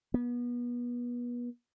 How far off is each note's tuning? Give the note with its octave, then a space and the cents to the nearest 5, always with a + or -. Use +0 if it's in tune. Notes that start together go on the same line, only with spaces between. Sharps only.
B3 -30